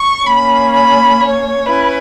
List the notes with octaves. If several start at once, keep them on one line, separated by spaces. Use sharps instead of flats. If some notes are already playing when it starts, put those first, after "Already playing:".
Already playing: C#6
A#3 C#4 B5
B5
C#5
C#4 E4 B4